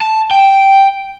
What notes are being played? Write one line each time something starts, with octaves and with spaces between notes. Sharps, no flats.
A5
G5